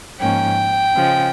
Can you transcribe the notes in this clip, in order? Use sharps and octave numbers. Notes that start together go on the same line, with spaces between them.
G#2 F3 A#3 C#4 G5
C#3 F3 G#3